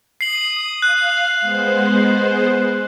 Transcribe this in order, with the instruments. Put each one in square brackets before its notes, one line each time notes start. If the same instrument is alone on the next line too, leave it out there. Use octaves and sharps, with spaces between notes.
[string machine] D#6 [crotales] C7 F#7
[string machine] F5 [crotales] F#6
[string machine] G#3 B3 C5